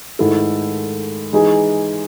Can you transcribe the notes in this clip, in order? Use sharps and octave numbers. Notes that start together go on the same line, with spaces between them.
G#2 D#3 A3 E4 A4
E3 G#3 D#4 G#4